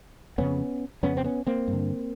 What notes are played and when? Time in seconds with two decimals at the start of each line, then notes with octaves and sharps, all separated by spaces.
0.38 F2 C#3 B3 C#4
1.03 F2 C#3 B3 C#4
1.17 C4
1.24 B3 C#4
1.47 A#3 C4
1.68 G2
1.73 D3